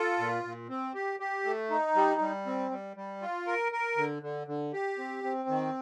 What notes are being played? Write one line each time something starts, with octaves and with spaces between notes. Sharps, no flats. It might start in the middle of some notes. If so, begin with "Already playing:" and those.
Already playing: F4 A4
A#2
A#2
C4
G4
G4
A3
D#4
G3
G3
C4
G3
G3
F4
A#4
A#4
D3
D3
D3
G4
C4
C4
D#3